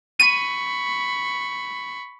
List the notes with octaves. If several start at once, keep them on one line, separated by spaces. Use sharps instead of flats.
B5 C#6 D#7